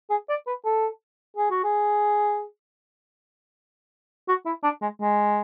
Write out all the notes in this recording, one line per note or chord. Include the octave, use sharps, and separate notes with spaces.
G#4
D5
B4
A4
G#4
F#4
G#4
F#4
E4
D4
G#3
G#3